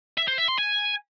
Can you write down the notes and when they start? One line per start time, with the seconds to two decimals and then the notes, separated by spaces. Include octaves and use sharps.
0.18 E5
0.28 C5
0.38 E5
0.48 C6
0.58 G#5